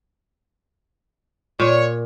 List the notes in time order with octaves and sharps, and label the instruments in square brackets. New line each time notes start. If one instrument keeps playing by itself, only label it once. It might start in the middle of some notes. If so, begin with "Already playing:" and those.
[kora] A#2 [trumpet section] C#5